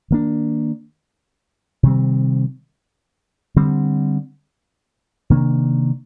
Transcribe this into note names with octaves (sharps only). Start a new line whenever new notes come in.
D#3 A#3 D4
C3 D#3 G3 C4
D3 G3 C4
C3 D#3 A#3 D4